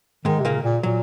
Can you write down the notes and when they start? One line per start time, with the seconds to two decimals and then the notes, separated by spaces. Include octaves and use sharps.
0.25 G#2 D#3 G#3
0.40 C3
0.45 A#2 C#3 A#3
0.64 A#2
0.83 A#2 F#3